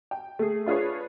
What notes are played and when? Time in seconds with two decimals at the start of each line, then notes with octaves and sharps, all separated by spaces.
0.11 G5
0.39 A3 G#4
0.66 D4 F4 G#4 B4 C#5